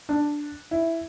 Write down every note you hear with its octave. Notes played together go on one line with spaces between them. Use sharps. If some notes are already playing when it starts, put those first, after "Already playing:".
D4
E4